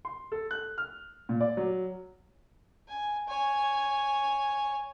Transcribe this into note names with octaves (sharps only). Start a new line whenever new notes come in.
C6
A4
F#6
F6
A#2
D5
F#3
G#5
C#5 G#5